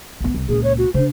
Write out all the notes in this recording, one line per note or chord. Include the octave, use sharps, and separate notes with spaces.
B1 B3
C2
C#2 A#2 G#4
C#5
F#4
C#3 D4 C5